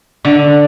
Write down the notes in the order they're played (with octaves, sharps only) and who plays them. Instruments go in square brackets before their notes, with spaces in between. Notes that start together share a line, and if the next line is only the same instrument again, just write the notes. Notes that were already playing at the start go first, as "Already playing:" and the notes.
[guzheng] D3